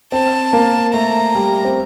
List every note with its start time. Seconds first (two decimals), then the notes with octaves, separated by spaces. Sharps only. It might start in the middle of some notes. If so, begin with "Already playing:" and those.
0.12 C4 A5
0.53 A#3
0.94 A3 A#5
1.35 G3
1.65 C4